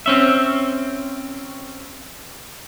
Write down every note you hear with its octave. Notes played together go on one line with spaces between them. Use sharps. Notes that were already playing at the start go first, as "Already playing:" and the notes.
C4 C#4 E5